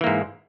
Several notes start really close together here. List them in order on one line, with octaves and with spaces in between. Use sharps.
E3 A#3 G#2